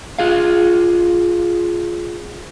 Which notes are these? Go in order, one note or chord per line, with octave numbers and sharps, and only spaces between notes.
F4 G#4 F5